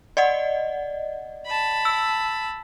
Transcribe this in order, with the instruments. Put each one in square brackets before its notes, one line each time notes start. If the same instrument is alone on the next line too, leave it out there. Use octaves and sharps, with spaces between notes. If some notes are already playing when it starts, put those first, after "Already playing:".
[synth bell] D5 D#5 F#5
[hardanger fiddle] A5 B5
[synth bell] E6